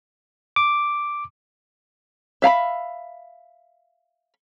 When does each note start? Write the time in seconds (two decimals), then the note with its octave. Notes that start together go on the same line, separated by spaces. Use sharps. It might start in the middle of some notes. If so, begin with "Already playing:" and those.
0.56 D6
2.42 E5 F5 A#5 B5